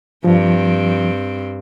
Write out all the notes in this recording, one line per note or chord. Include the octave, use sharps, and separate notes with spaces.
G2 F3 C4